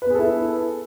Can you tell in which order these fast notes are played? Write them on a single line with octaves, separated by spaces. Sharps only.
B4 B3 G#4 A4 E4